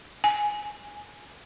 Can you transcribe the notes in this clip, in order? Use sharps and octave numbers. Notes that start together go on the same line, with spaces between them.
G#5